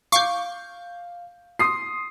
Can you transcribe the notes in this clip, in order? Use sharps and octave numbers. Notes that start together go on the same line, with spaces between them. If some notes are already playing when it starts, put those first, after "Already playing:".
F5 C#6 D6 G6 C7
C6 D#6 C7